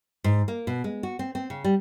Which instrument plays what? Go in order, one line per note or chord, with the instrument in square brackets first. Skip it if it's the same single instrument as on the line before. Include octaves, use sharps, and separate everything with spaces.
[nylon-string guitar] G#2
A#3
B2
G#3
F#4
C4
C4
C#3
G3